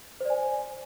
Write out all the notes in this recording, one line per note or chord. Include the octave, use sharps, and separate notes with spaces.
C5 D5 G#5